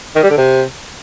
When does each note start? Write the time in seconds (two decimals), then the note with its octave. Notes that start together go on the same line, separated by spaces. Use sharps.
0.15 D#3
0.23 G3
0.30 D3
0.38 C3